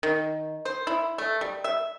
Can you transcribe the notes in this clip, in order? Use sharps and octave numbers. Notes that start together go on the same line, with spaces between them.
D#3
C5
E4
A3
G3
E5